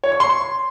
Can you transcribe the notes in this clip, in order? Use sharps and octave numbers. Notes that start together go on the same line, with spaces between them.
C#5
C#6
C6